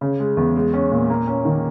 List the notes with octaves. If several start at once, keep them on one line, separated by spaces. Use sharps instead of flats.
C#3
G#3
E2
G#3
C#4
A#2
A#3
C#4
D#3